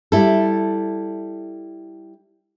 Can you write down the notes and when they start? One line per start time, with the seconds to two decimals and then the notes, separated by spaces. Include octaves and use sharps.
0.12 G3 E4 A4